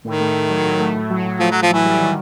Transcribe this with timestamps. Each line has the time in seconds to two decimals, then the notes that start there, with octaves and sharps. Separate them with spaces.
0.05 A2 D#3
0.20 A3
0.35 A2
0.49 F#3
0.65 A2
0.80 A3
0.96 A2
1.10 F#3
1.25 A2
1.39 F3 A3
1.51 F#3
1.55 A2
1.62 F3
1.70 E3 F#3
1.85 G3
2.00 D#3